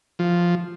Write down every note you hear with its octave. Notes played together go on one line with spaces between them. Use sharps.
F3